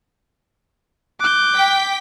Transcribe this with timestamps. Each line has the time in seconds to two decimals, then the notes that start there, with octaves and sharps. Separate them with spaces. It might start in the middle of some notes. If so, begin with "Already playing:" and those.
1.20 D6 F#6 G6
1.55 G5 B6